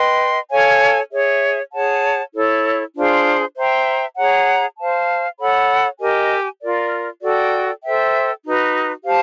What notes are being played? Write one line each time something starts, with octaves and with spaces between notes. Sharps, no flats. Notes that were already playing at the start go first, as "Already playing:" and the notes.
Already playing: B4 D#5 G5 C6
A4 C#5 F5 G#5
G#4 C#5 E5
G#4 C#5 F#5 A5
E4 A4 C#5
D4 F4 G#4 C5
C5 E5 G5 A#5
G#4 C#5 F#5 A#5
C5 F5 A5
A4 C#5 F#5 B5
G4 A#4 D#5 G#5
F4 A#4 D5
F#4 A4 D5 G5
A4 C5 E5 G5
D#4 F#4 B4
G4 C5 F5 A5